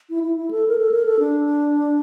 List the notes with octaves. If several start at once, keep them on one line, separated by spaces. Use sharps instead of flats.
E4
E4
E4
A4
A#4
A4
A#4
A4
D4